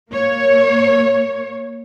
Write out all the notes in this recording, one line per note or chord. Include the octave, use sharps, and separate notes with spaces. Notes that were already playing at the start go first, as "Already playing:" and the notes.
A#3 C#5